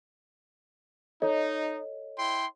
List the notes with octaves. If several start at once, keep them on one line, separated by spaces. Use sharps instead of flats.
D#4 A4 C#5 D#5
E4 G5 C6